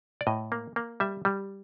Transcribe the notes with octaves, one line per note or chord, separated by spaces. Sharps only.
D5
A2 D#5
A#3
A#3
G3 E5
G3